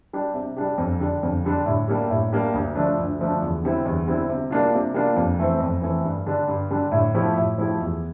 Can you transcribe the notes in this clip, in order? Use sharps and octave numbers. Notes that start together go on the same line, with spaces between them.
G3 D4 G4
C3
G3 D4 G4
F2
D3 G3 D4
F2
D3 G3 D4
A2
G3 A#3 D4 G4
A2
G3 A#3 D4 G4
D2
D3 F3 A3 D4
D2
D3 F3 A3 D4
E2
D3 G3 C4 E4
E2
D3 G3 C4 E4
C3
G3 A#3 D4 F4
C3
G3 A#3 D4 F4
F2
E3 A3 C4
F2
E3 A3 C4
G2
D3 G3 D4
G2
D3 G3 D4
A2
F3 A3 E4 G4
A2
F3 A3 E4 G4
E2